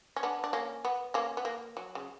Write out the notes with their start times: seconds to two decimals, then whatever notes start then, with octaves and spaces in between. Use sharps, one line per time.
0.16 C#4
0.23 B3 D4
0.44 D4
0.53 A#3 C#4
0.85 B3
1.14 A#3 C#4
1.37 B3
1.45 A#3
1.77 F#3
1.95 C#3